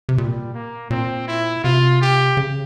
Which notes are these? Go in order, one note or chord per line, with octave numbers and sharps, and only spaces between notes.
C3
A#2 G3
A#3
A#2 C4
E4
C3 F4
G4
C#3